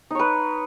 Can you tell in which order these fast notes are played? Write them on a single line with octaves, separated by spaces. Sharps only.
D#4 C#5 B4